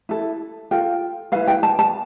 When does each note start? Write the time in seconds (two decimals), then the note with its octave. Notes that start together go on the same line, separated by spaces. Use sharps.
0.09 E4 A4
0.71 F4 A4 G5
1.32 B4 F5
1.36 E4
1.48 G5
1.63 A5
1.79 A5